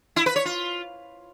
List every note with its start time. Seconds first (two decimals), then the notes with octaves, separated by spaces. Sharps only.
0.16 E4
0.26 B4
0.36 C#5
0.45 F4